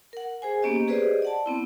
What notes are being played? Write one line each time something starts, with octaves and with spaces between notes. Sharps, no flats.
A#4 F#5
G#4 C5 G#5
A#3 B3 C#4 G4 D#5
G4 G#4 B4 C5 D5 D#5
D5 F#5 A5
B3 C4 E4